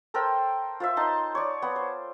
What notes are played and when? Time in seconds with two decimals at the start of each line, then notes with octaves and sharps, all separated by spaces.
0.14 A4 A#4 C5 G5
0.80 F4 C5 E5
0.97 D#4 A5 C6
1.35 C#5 D5
1.62 B3
1.76 C5